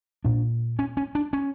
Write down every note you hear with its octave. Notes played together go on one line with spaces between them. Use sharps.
A#2 D4
C#4
C#4
D4
C#4